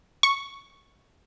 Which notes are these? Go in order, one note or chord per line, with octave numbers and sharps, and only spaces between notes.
C#6